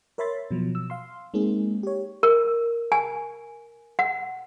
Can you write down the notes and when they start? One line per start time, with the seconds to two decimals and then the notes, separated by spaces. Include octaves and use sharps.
0.18 A#4 C#5 E5 B5 C6 A6
0.51 B2 F3 F#3
0.75 E6
0.90 F5 C6
1.34 G#3 A#3 C4 D#4 G#4
1.83 G4 C#5
2.23 A#4
2.92 G#5
3.99 F#5